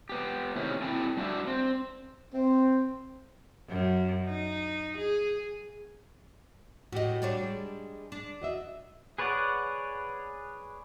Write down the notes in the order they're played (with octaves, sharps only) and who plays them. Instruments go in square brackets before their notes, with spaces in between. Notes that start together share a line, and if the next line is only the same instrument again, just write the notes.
[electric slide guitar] B3 G4
A2 C3 D#3 C#4 G4 G#4
C4 E4 G4 A4 G5 G#5
G3 D4 F#4 G4 E5
C4
[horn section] C4
[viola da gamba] F#2
D#4
G#4
[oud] A2 D#5 [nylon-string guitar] F#4 G4
[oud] G3 D4 C#5
[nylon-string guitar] G#3
[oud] D4
[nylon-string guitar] F#4 D#5 E5
[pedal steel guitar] G#4 B4 C#5 D5 F#5